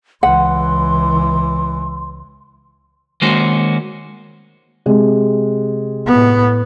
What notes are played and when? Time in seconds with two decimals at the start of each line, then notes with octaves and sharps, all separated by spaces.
0.23 C#2 E3 F#5 C6
3.22 D#3 G#3 A#3 C#4 F#4 C5
4.86 C3 G#3
6.07 A2 B3